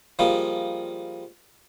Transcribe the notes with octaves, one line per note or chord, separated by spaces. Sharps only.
F3 G3 G#3 A#3